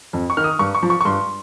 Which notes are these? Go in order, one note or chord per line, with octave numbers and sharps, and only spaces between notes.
F2
C#6
D#3 F6
D#6
G2 C#6
C#6
F3
C#6
C#6
G2 C6